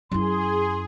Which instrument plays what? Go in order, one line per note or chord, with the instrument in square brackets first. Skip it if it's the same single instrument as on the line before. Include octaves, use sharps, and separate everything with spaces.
[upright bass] F#2 E4 [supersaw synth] G#4 [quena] C6